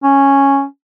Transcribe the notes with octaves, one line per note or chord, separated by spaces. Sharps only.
C#4